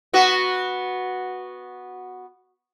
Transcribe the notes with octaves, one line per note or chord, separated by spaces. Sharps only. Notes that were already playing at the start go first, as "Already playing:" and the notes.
B3 F#4